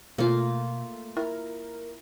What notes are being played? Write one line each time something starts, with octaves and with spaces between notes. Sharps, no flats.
B2 A3 A#3 F4
E4 A#4